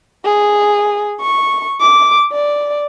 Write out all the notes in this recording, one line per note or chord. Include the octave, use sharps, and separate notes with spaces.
G#4
C#6
D6
D5